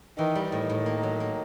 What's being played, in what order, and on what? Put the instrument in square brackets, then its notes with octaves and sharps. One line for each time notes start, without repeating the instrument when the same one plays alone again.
[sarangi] D#3 [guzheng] E3
[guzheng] G3
[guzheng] A2 [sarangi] D#3
[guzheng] A2
A#3
F#3
A#3